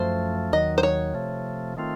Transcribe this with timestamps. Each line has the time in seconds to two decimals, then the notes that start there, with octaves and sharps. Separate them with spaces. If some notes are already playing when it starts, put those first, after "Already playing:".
Already playing: F#2 F3 A3 C5
0.52 D#2 D#3 F#3 D#5
0.78 C5
0.83 C#5
1.14 C3 F3 A3
1.77 D#3 A3 C4 F4